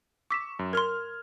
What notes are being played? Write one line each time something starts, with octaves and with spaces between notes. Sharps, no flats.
C#6 D6 E6 B6 E7
F#2
A#4 C6 F6 G#6